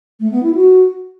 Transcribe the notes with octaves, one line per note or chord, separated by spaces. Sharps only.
A3
B3
E4
F#4